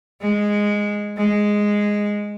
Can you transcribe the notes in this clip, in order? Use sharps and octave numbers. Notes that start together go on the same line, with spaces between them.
G#3
G#3